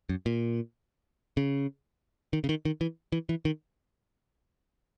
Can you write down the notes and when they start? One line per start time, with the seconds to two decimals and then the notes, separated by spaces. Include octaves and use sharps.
0.09 F#2
0.26 A#2
1.37 C#3
2.33 D#3
2.44 C#3
2.49 D#3
2.65 D#3
2.81 E3
3.12 E3
3.29 E3
3.45 D#3